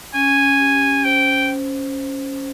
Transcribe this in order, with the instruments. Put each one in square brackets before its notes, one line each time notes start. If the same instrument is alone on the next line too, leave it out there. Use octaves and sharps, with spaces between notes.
[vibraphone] C#4 [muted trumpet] G#5
[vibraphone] C#4
G4
C#4
[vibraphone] C5 [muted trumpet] G5